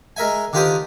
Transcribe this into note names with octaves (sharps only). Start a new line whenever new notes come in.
G#3 A#4 E5 G#5
D3 D#3 F4 G4 C5 D#6